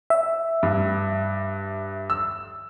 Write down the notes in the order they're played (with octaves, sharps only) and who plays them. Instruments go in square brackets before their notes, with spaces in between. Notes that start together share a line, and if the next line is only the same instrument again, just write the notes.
[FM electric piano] E5
[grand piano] G2
E6